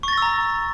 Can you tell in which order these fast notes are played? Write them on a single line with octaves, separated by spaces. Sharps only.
C#6 A6 A#6 E6 A#5